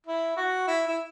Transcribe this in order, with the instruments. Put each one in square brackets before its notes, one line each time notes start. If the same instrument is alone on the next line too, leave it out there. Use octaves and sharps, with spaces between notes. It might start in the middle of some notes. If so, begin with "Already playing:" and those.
[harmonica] E4
F#4
E4
E4